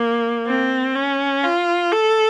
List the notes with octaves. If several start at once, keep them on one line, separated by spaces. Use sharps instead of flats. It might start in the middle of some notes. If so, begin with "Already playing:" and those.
Already playing: A#3
C4
C#4
F4
A4